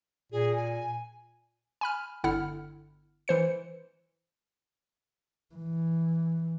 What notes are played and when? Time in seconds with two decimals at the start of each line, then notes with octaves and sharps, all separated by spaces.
0.32 A#2 G#4
0.56 G#5
1.81 G#5 B5 F6
2.24 G1 D3 E4 F#5 F6
3.28 E3 C5 C#7
5.55 E3